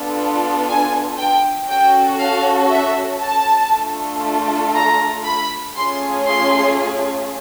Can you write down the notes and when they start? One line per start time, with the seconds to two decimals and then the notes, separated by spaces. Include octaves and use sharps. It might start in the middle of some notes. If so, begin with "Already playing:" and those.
Already playing: B3 D4 F4 A4
0.67 G#5
1.17 G5
1.68 C#4 F#4 A4 G5
2.19 F5
2.70 E5
3.21 A5
3.72 A3 D4 F4 A4
4.74 A#5
5.25 B5
5.76 A3 C#4 F4 G#4 C6
6.27 C6